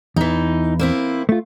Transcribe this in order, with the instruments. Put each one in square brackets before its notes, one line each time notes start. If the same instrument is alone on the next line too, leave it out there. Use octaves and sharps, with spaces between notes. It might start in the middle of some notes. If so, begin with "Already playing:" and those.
[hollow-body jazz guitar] E2 [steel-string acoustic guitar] E3 D#4
[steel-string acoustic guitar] A#3 C4 E4
[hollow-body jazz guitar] A3 F4